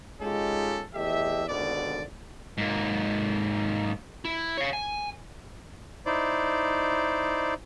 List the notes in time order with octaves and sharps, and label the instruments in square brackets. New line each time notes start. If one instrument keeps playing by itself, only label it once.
[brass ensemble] G#3 C#4 D#4 F4 G4 A4
E2 A3 G4 D#5 E5
G#1 D#2 B2 D3 D5
[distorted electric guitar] G#2 A#3
E4
C#5 F5
G#5
[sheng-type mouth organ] D#4 E4 C5 D5